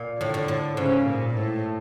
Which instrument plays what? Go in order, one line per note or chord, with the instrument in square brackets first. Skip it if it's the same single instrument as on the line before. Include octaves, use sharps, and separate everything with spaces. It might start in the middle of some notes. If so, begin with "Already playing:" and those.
Already playing: [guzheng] A#2
[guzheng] A2 [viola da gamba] D3
[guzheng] A2
A2
[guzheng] G#2 [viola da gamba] C#3
[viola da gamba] A#2
A2